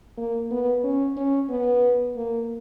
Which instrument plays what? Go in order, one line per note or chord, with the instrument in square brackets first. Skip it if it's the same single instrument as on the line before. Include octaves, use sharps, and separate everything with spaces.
[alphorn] A#3
B3
C#4
C#4
B3
A#3